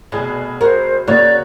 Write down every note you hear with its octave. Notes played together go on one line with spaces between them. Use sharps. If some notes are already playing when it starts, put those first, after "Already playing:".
F1 B2 G#4
F#4 A#4 C5
C#3 A#3 F#4 C#5 D5